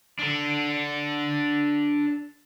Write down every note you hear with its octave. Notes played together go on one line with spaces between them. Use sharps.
D4 A4